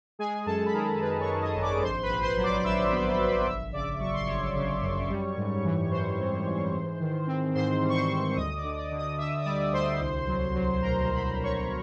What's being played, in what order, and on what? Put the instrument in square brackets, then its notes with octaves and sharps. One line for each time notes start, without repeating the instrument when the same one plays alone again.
[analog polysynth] G#3 G#4 G#5
G#5
F#2 A4 A5
B5
D#3 A#4 A#5
G#3 B4 B5
C#5 C#6
G#3
D#5 D#6
G#1
D5 D6
A#1 C5 C6
B4 B5
A#1
C5 C6
F#3
D5 D6
A#1 E5 E6
B3
A#1
G1 E5 E6
C#3 D5 D6
F#3 C#6
C6
G1 C#5 C#6
C#3
F#2
G3
G#2
E3
E3 C5 C6
C4
E3
G#2
D#3
C4
G#2 C5 C6
G3
C#6
C5 C6
G3
D2 D#5 D#6
D5 D6
D3
D5 D6
D3
D#5 D#6
D2 E5 E6
D#6
G3 D5 D6
D2 C5 C6
C2
F#3
F#3
B2 A#4 A#5
F#3 B5
C5 C6
C2
C#5 C#6